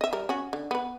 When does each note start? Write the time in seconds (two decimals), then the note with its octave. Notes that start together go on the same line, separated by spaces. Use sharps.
0.01 D#5 E5
0.13 G3 A#4
0.29 C#4 F#4
0.53 D3
0.71 B3 B4